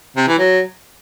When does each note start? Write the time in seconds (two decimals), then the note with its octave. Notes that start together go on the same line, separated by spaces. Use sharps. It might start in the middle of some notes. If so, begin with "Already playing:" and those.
0.17 C3
0.28 E3
0.39 F#3